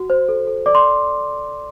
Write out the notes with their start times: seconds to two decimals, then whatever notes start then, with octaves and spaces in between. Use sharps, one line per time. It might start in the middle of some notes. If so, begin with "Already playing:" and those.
Already playing: F#4
0.10 C5
0.29 A4
0.47 A4
0.66 D5 D6
0.75 C6